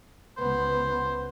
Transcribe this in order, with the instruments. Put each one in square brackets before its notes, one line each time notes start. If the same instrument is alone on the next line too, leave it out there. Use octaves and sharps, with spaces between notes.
[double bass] C#2 B3 [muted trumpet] C5